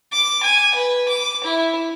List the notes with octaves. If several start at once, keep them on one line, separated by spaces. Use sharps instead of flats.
D6
G#5
B4
D6
E4